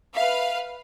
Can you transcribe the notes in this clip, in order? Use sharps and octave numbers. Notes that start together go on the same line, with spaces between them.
B4 E5 F5